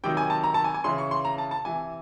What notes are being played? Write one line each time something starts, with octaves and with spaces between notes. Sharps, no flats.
C3 D#3 F#3 G5
G#5
A5
A#5
A5
G#5
G#5
C#3 E3 C6
C#6
C6
A#5
A5
A5
C3 E3 G#5